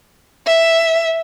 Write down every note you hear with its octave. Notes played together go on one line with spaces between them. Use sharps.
E5